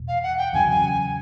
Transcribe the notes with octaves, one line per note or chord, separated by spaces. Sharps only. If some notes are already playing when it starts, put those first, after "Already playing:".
Already playing: E2 B2
F5
F#5
G5
E2 C#3 F#3 G#5
G#5